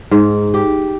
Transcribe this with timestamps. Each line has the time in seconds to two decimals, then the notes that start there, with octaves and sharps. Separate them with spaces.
0.11 G#2
0.54 G4